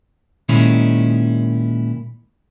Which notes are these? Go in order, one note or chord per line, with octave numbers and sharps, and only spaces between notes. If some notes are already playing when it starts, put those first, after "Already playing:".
A#2 D#3 G#3 C#4 D#4 E4